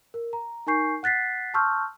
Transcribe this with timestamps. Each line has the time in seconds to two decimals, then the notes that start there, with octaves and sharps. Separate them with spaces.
0.14 A#4
0.33 A#5
0.67 D#4 A#4 G#5 C#6 G6 C7
1.03 F#5 F#6 A6 B6 C7
1.54 A5 C6 C#6 E6 F6 G6